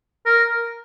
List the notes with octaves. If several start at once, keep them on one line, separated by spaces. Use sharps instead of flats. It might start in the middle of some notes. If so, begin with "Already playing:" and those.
A#4